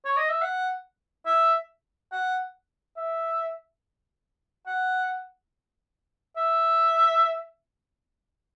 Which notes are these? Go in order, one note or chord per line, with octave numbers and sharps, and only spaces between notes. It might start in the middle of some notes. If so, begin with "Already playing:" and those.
C#5
D#5
E5
F#5
E5
F#5
E5
F#5
E5